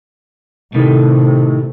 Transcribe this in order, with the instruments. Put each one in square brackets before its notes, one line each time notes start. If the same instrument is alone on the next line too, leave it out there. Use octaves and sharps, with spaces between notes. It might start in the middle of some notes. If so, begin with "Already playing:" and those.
[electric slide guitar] A2 D#3 [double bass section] C3 A3